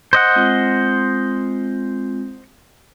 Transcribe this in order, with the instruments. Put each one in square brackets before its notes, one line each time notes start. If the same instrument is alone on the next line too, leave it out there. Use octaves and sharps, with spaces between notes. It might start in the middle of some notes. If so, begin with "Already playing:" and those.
[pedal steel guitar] C5 D#5 F#5
[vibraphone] G#3 C4 F4